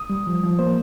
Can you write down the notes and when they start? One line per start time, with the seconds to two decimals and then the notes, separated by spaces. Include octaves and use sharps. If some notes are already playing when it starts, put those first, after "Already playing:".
Already playing: D#6
0.10 G3
0.27 F3
0.43 F3
0.59 A#3 C5